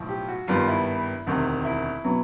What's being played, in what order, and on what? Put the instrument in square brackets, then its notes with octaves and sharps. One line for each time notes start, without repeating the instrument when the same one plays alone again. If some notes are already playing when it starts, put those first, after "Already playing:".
Already playing: [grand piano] B1 A2 F3
G4
F#4
G#1 G2 D#3 G3 B3 F4
E4
E1 D2 C3 D#3
E4
B2 F#3 B3